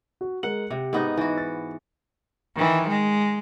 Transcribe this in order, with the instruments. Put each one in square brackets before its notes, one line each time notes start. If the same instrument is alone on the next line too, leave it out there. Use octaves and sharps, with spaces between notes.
[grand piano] F#4
[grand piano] G#3 A#4 F#7 [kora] F#5
[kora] C3 [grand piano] G4
[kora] G#2 B3 D#4
[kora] E3 F#4 [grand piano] D#4
[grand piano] A6
[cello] D#3 E3
G#3